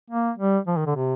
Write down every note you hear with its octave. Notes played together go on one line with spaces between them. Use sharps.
A#3
G3
F3
D#3
D3
C3